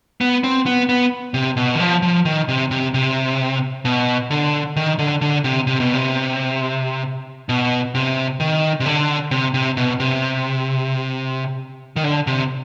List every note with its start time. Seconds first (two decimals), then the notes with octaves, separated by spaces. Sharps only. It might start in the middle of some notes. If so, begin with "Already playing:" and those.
0.21 B3
0.44 C4
0.66 B3
0.89 B3
1.34 C3
1.57 B2
1.75 D#3
1.80 F3
2.02 F3
2.25 D#3
2.48 C3
2.71 C3
2.94 C3
3.85 B2
4.30 D3
4.76 D#3
4.99 D3
5.21 D3
5.44 C3
5.67 C3
5.80 B2
5.94 C3
7.49 B2
7.95 C3
8.40 D#3
8.80 C3
8.86 D3
9.31 C3
9.54 C3
9.77 B2
10.00 C3
11.96 D#3
12.04 D3
12.27 C3